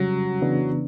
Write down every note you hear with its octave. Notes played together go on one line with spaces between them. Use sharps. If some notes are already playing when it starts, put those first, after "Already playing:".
Already playing: C#3 F#3 G3 C#4
C#3 E3 B3 D4